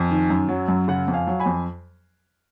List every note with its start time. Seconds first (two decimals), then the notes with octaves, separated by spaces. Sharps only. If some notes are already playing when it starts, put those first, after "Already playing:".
Already playing: F2 G#5
0.11 D#3
0.30 F#2
0.49 F#3
0.68 F#2
0.88 C#3 F#5
1.08 F2
1.13 F5 G#5
1.27 F#3
1.40 G#5 B5
1.46 F2